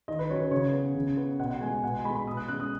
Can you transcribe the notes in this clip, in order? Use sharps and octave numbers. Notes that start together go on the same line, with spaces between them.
D#3 D#5
B4
F#3 C#4 C#5
B4
C#3 C#5
B3
C#3
B3
B2 F#5
F#5
G#3 B3 G#5
G#5
B2 F#5
G#5
G#3 B5
B3
B5
B2 D#6
F#6
G#3 C#4 F#6
D#6